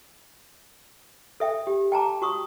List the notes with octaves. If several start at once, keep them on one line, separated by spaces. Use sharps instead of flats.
A4 E5 G5
G4
G5 A5 A#5 D6
F#4 C#6 D#6